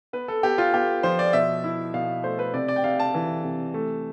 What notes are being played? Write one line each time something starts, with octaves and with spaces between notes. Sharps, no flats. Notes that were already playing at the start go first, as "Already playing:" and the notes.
B3 B4
A4
B3 G4
F4
B3 G4
F3 C5
D5
B2 E5
E4
B2 F5
A3 C5
B4
C3 D5
D5
G5
C3 F5
A5
E3
C3
A3